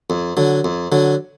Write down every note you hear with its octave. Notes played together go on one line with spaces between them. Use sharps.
F2
D3 F#3
F2
D3 F#3